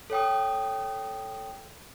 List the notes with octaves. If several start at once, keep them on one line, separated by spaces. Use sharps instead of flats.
A4 C#5 G5 D#6